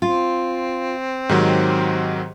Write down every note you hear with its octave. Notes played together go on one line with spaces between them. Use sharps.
C4 F4
G#2 D#3 F#3 G4